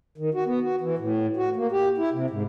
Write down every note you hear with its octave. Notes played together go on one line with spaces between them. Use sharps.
D#3
F#4
B3
F#4
E3
A2
F#4
A#3
G4
E4
C3
G#2